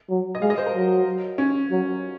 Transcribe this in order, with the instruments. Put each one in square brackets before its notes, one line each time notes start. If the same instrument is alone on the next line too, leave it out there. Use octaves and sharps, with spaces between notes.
[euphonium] F#3
[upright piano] D#5
[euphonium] G#3 [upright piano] F5
[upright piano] D#5
C5
A#4
[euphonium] F#3
[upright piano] C#4
[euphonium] F#3